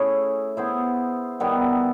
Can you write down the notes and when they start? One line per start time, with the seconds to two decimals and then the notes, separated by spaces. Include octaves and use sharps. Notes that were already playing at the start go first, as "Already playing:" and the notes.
Already playing: A3 C#4 E4 G#4
0.57 B3 E4 G#4 C5
1.40 D#3 G3 B3 E4